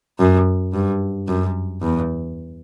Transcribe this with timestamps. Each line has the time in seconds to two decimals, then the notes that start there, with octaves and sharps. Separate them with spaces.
0.19 F#2
0.73 G2
1.28 F#2
1.82 E2